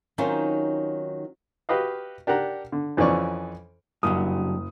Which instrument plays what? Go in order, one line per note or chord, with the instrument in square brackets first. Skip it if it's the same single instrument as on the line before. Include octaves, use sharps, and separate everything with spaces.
[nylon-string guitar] D#3 F#3 C4 C#4 D#4 F4
[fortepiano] F#4 G4 B4 D#5 F5
D4 G4 A#4 F#5 A#5
D3
F2 E3 F3 C#4 D5 C#6
[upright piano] F#1 D#6 [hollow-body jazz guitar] G2 C#3 F#3